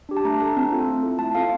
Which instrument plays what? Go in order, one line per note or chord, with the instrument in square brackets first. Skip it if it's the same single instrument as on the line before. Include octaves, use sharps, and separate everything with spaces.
[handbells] D4 G4
A5
A3 A#5
D4 A4 A5
C4
F4 A4
A3
E4 A4
A3 A5
C4 F4 A4 F5